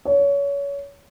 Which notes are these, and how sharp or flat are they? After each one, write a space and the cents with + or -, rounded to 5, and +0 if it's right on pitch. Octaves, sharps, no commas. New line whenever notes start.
C#5 +25